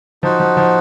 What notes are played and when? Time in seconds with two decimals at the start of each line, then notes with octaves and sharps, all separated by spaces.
0.23 F3 D#4 F#4 C5 F#5
0.40 F3
0.57 F3